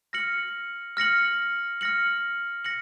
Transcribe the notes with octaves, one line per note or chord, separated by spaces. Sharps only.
F6 A#6 C#7 F#7
F6 A#6 C#7 F#7
F6 A#6 C#7 F#7
A#6 C#7 F#7